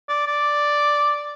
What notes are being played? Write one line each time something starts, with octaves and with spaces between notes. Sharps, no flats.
D5
D5